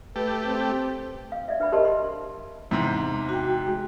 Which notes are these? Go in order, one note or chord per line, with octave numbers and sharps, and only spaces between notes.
A3 G4 B4
C4
F5
D5 E5
D4 B4 E5 G5 B5
G4 A#4 C5 D#5 A5 C6
C6
E2 G#2 C3
F#4 G5
G#3